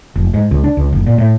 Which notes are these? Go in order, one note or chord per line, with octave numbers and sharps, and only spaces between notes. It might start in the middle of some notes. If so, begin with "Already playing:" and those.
F1
G#2
C#2
D4
C#2
F#1
A#2
A2